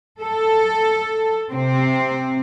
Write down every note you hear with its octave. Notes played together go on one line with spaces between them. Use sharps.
A4
C3 C4